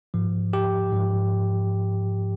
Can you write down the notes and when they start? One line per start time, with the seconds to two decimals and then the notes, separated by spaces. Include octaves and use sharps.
0.14 G#2 F3
0.53 G4
0.93 G#2 F3